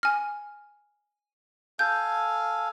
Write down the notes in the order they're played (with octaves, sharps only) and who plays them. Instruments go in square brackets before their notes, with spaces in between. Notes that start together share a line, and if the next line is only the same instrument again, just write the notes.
[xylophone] G#5 F6
[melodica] A4 F5 G#5 [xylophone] G6